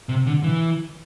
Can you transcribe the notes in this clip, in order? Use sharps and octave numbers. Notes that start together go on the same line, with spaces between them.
C3
D3
E3